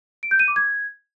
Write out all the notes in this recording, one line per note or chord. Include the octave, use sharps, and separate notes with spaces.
D7
G6
D#7
D6
G#6